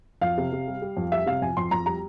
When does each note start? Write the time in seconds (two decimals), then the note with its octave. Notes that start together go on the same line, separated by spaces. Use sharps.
0.22 F2 F5
0.38 C3
0.53 C3
0.67 G3
0.82 G3
0.97 F2
1.12 G3 E5
1.26 C3 F5
1.42 F2 G#5
1.57 F2 C6
1.71 F2 A#5
1.86 G3 A#5